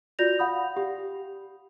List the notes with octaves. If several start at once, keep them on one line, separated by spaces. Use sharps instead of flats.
F4 F#4 D5 G6 A#6 F7
F5 F#5 B5 D#6
G4